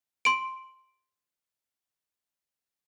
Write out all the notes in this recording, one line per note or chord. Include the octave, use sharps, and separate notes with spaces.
C6 D7